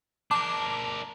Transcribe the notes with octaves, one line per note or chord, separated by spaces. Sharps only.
D4 A#4 A5 D6